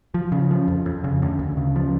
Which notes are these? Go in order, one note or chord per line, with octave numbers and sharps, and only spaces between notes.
F3
C#3
F3
F2
F2
C#3
D2
D2
C#3
F3